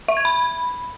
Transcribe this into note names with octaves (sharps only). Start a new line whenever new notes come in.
E5
G#6
B5